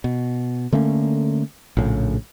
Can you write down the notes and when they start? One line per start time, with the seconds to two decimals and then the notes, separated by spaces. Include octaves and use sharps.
0.04 B2
0.73 D3 A3 A#3 C#4
1.77 A#1 A2 C#3